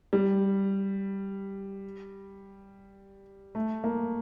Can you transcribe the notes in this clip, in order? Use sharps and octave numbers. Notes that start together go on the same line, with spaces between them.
G3
A3
A#3